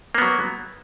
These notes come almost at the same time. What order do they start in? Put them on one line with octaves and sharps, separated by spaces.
A#3 B3 F#3